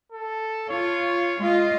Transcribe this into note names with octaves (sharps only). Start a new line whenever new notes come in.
A4
F4 C#5
G#3 F4 D#5